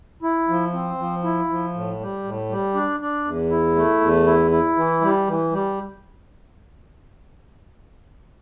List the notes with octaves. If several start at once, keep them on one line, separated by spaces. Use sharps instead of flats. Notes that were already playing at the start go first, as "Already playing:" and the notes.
E4
F3
C4
F3
E4
F3
A2
G3
A2
G3
D4
D4
E2
E4
A3
E2
E4
E4
E3
G3
E3
G3